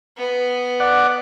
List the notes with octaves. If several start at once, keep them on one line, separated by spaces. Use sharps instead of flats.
B3
D5 F#5